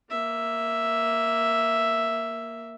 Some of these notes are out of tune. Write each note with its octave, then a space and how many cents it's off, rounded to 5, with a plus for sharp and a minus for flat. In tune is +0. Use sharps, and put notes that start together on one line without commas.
A#3 +0 E5 +0